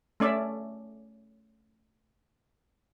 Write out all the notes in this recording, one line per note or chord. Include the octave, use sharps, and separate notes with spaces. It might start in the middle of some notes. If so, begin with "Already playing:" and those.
A3 C#4 D5 E5